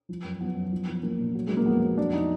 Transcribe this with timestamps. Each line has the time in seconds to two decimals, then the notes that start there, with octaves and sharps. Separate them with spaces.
0.09 F3
0.24 F#2
0.41 F3 B3
0.56 F#2
0.72 F3
0.88 F3
1.03 F3 A#3
1.19 A#2
1.35 F#3
1.47 F#3 G#3
1.57 A#3
1.66 F2 B3
1.82 F#3
1.98 F2 D4
2.13 D#4